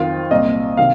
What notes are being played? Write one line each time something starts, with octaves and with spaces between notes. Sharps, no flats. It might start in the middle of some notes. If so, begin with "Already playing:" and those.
Already playing: F2 D#3 F4
C2 A#2 D#5
C3 D#3 F5